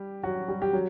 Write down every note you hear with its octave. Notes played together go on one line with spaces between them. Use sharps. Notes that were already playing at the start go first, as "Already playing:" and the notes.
Already playing: G3 G4
F#3 F#4
G3 G4
G4
F#3